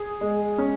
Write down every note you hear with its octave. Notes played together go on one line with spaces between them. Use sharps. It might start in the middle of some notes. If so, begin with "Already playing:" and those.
Already playing: G#4
G#3
C#4